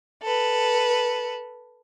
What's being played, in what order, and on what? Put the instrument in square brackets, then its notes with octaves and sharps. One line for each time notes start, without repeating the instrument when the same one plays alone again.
[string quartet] A4 B4